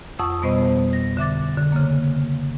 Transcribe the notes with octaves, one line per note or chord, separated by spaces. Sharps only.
F2 F#5 C#6 D#6 E6
B2 G3 B3 C5 D#5
A#6
D3 E5 D6 A6
D3
C#3 A#3